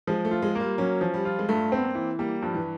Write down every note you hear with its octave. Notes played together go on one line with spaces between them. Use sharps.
F3 G#3
A3
F4
G#3
G3 A#3
F#3 C#4
F3
G3
F4
G#3
G2 A3
C4
B3
A#3
E3
G3 A#3
G2 F3
E3